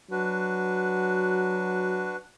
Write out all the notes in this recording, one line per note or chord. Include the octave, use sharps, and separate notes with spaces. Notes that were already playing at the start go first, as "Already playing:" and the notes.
F#3 D4 F#4 B4